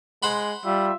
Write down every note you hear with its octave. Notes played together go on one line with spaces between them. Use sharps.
G#3 C5 F#5 B5
G3 F4 E5